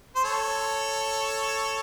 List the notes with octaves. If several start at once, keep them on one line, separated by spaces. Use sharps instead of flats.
C5
A4 C#5